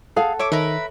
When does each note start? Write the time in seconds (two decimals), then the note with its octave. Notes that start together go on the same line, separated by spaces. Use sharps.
0.16 G#4 A4 F5 F#5
0.39 C#5 E5 D6
0.52 D#3 A#4 B4 E5